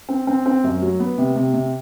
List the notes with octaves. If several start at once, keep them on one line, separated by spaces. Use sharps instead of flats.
C4
C4
C4
F#2
F#3
B3
C3
C3
C3